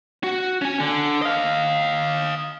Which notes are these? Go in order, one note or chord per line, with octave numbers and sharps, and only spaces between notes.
F#4
C#4 G#5
D3
D#5 F5